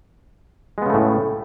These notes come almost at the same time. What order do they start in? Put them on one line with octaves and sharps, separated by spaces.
G#3 B3 C#3 A3 A2